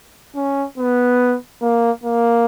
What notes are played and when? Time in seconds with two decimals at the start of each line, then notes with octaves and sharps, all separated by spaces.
0.36 C#4
0.78 B3
1.62 A#3
2.04 A#3